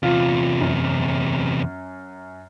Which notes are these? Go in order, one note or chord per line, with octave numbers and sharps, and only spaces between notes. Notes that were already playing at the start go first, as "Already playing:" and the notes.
E2 C3 F4
F#2